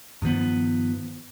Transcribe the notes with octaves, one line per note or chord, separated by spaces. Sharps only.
G2 D#3 F3 B3